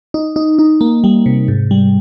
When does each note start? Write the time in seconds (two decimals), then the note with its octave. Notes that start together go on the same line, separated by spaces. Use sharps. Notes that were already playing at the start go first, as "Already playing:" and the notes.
0.14 D#4
0.36 D#4
0.59 D#4
0.81 A#3
1.04 G3
1.26 C3
1.48 G#2
1.71 G3